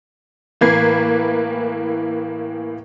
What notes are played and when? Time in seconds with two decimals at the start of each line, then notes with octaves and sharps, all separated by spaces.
0.61 A2 E3 A#3 B4 G#6 C7